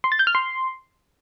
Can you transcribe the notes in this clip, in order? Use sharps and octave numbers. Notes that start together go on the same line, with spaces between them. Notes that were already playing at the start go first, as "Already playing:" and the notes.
C6
A6
G6
F6
C6